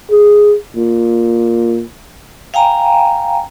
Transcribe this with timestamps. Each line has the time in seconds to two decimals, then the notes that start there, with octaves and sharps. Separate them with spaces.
0.11 G#4
0.76 A#2
2.54 F5 G5 G#5 A#5